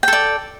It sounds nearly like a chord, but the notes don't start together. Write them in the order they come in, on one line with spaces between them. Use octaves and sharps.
G5 A4 D5